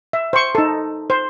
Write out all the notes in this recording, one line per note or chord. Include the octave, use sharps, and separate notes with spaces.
E5
C5 C#6
D#4 A4
C5